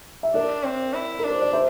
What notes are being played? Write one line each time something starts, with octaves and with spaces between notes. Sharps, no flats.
E5
D4 A#4 D5
C4
E4
D4 A#4
C5
D5
C5 E5